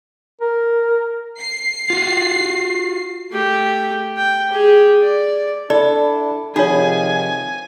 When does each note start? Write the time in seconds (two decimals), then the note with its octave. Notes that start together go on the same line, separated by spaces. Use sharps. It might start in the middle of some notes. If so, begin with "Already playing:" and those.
0.41 A#4
1.39 C7
1.90 F4 F#4
3.32 A3 G4
4.17 G5
4.49 G4 G#4
5.02 D5
5.70 D4 E4 A4 D5
6.56 C3 D#3 F3 D#4 F4 G#4 C#5 G#5